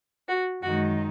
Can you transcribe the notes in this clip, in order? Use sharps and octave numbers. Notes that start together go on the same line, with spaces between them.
F#4
F#2 D#3 G#3 D#4 F#4